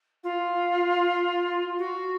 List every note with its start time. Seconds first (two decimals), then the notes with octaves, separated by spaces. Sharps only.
0.23 F4
1.78 F#4